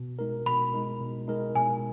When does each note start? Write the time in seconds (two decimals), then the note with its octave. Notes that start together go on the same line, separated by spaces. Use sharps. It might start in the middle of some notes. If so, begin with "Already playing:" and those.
Already playing: B2
0.19 G#3 D#4 A#4
0.46 B2 B5
0.73 G#3 D#4 A#4
1.01 B2
1.28 G#3 D#4 A#4
1.55 B2 G#5